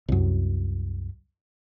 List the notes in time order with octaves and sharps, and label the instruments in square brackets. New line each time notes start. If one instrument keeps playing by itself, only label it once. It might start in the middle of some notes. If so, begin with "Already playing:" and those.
[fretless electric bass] C2 F#2